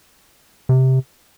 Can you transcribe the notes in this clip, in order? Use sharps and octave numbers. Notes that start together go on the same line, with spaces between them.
C3